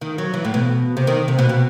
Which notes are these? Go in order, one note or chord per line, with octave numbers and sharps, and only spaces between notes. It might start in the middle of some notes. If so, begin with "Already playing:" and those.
D#3
F#3
E3
A2
B2
C3
D#3
C3
B2
B2